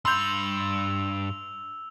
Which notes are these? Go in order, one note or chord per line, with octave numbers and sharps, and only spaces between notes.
G2 B5 C6 E6 G6 F7